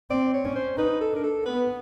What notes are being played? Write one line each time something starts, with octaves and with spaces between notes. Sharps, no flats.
C4 D5
C#5
C#4
C5
D#4 B4
A4
D4 A#4
A4
B3 B4